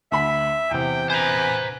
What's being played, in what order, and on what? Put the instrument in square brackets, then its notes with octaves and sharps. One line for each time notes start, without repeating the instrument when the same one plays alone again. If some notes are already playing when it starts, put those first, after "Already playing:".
[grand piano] D2 B5 B6 [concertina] E5
[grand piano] E2 C3 [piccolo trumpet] G5
[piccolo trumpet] B4 [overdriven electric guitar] C5 A#5 [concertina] G#5